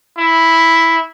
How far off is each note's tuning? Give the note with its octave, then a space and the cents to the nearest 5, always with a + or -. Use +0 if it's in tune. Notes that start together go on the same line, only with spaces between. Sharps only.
E4 -5